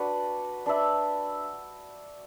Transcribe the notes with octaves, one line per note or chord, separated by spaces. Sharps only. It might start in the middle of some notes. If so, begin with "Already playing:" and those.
Already playing: D4 F#4 B4
D4 B4 E5